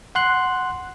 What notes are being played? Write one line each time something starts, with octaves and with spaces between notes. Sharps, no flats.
F#5 C6 F#6